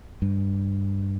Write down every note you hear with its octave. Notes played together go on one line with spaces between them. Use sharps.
G2